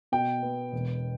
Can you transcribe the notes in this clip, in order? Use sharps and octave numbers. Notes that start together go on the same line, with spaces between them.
B2 G5
B3
E1